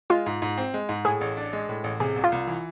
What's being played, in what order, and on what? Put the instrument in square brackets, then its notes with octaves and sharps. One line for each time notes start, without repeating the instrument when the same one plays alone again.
[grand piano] G#3 [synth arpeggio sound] F4
[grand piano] G#2
G#2
C4
G#3
G#2
[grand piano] A2 [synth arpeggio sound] G#4
[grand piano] A1
D4
G#3
A2
A1
[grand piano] C3 [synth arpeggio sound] G#4
[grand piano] C2
[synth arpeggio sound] F4
[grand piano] C2
E3